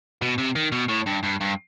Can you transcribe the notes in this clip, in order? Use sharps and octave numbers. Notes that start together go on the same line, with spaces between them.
B2
C3
D#3
B2
A2
G2
G2
G2